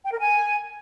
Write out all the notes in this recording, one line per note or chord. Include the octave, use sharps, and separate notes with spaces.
G5
A#4
G#5